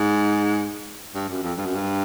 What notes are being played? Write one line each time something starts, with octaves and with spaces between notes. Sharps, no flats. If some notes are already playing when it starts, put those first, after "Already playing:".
Already playing: G#2
G2
F#2
F2
G2
F#2
G2